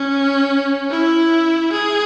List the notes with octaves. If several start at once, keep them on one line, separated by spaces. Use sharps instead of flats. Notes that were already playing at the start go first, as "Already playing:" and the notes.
Already playing: C#4
E4
G#4